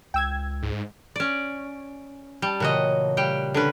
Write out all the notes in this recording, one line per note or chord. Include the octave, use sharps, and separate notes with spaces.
C#2 G5 E6 G#6
G#2
C#4 D5
G3 G5 A5
A#2 C#3 E3 A3 F#4 D#5
G3 F5 G5 F#6
D3 C#4 B4